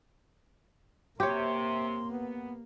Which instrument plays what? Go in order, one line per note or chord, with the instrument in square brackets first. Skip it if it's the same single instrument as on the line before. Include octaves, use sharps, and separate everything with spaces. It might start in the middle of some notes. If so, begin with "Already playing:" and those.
[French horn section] C3 [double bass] A#3 [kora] G4 C#5 [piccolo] C6
[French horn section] B3